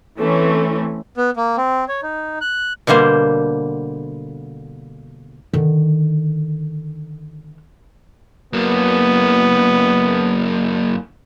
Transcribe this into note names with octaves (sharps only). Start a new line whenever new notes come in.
E3 A3 C4 C#4
B3
A#3
C4
C#5
D#4
F#6
B2 D3 G3 A#3 C5
D3 D#3
F#2 A#3 B3